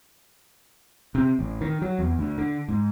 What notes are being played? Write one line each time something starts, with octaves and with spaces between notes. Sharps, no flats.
C3
A1
D#3
F#3
E2
D2
D3
G#2